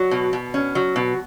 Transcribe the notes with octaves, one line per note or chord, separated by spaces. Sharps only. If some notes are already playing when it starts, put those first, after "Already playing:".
Already playing: F#3
B2
B2
C#4
F#3
B2